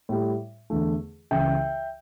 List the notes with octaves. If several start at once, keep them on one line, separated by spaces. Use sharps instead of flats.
A2 G3
E2 D3 A3
C#2 C#3 E3 E5 G5